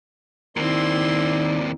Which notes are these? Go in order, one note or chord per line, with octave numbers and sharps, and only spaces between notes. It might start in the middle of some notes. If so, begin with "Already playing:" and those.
D#2 D#3 C4 D#4 E4 D5 C6